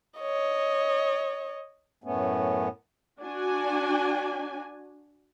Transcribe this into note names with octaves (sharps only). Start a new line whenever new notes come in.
C#5 D#5
F#2 A2 A3 B3 C#4
D4 F#4 G#5